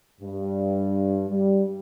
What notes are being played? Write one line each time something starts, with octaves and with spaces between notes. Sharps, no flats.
G2
G3